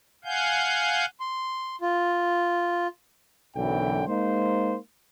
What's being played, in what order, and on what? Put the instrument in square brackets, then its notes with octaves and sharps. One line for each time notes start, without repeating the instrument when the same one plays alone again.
[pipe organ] F5 F#5 G#5 G6
[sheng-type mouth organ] C6
F4
[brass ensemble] B1 F#2 D3 E3 G5
G#3 A#3 D#4 C5